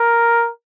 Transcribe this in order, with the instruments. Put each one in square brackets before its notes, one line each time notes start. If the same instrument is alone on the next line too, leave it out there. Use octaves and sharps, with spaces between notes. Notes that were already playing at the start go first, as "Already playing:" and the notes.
Already playing: [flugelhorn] A#4